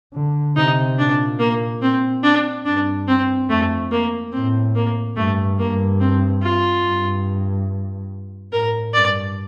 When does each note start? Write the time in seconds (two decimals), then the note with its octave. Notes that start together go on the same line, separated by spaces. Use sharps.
0.13 D3
0.56 C3 D#4
0.98 A#2 D4
1.39 A#3
1.82 C4
2.23 D4
2.65 G2 D4
3.08 C4
3.49 F2 A3
3.91 A#3
4.32 A2 C4
4.75 A#3
5.16 G2 A3
5.58 G2 A#3
6.00 C4
6.42 F4
6.84 G2
8.52 A2 A#4
8.93 G2 D5